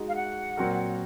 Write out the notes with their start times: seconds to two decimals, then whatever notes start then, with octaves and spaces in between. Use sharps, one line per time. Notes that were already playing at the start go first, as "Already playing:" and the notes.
Already playing: G#3 D#4 F#4
0.08 F5
0.16 F#5
0.57 A#2 F#3 C4 F#4 A#4